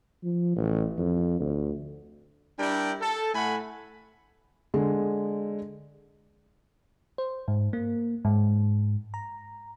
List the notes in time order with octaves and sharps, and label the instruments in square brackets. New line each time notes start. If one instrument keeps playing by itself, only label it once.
[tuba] F3
A1
F2
D2
[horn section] G3 D4 E4 A#4 G5
A4
A2 A3 F#5 G#5 B5
[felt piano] D3 G#3
[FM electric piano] C5
G#2
A#3
G#2
A#5